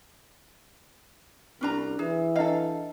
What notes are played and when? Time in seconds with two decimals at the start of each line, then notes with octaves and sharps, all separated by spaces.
1.61 C2 C#4 D4 A#5
1.99 E3 G#4
2.36 D4 A4 D#5 F5